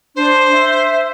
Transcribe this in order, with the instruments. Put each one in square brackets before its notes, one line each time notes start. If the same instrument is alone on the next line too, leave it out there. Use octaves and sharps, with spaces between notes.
[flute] D4 [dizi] C5
[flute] E5